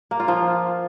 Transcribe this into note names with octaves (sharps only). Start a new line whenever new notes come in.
A#3
F4
F3